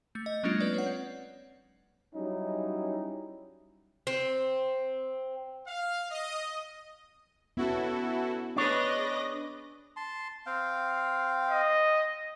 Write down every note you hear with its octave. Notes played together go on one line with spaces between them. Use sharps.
A3 G6 C#7
D#5
F#3 G#3 A#3 C#4 D4 F4
C4 B4 D5
C#5 F#5
C4
F#3 G3 C#4 D#4 E4
C4
F5
D#5
B3 C#4 E4 F#4 A4
D4 G#4 B4 C#5 D#5 D6 A#6
A5 C6
C4 F5 G5
D#5